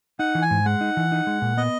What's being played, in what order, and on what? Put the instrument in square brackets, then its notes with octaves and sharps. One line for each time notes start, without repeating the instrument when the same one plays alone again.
[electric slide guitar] D#4 [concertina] F#5
[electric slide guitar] E3
[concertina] G#5
[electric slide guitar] G#2
[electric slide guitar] G#3 [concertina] F#5
[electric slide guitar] D#4
E3
D#4
G#3
A#2
[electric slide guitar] B3 [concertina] D#5